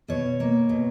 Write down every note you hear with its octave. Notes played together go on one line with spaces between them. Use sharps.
B2 C#5
A#3
B2